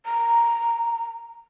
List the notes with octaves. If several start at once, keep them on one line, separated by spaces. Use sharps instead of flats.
A#5